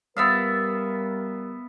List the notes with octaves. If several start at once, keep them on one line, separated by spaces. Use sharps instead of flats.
G3 B3 A#4 E5 F5